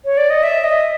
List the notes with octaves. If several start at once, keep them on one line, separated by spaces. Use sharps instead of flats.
C#5
D5
D#5
E5
D#5